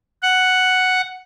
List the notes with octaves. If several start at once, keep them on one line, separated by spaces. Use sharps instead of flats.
F#5